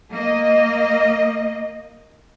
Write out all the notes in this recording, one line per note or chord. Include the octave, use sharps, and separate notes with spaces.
A#3 D#5